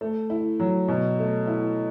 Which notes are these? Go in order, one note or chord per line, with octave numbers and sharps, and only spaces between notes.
A3
E4
F#3
B2
A3
E4